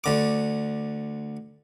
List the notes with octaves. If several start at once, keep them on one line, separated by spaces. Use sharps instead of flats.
D2 D3 D6